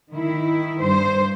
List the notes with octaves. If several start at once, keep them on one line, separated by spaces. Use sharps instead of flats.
D#3 E4
G2 C5